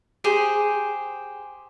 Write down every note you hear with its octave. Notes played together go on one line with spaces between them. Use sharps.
G4 G#4 C5